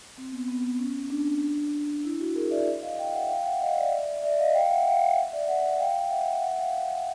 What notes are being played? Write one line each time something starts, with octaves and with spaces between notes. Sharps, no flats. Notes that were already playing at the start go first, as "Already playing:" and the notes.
C4
B3
B3
C#4
D4
E4
E4 F#4
G#4 A#4
D5 E5
D#5 F5
F5 G5
E5 F#5
F5 G5
E5 F#5
D#5 F5
D5 E5
D5 E5
D#5 F5
F5 G5
E5 F#5
F5 G5
E5 F#5
D5 E5
E5 F#5
F5 G5
F5 G5
E5 F#5
E5 F#5
F5 G5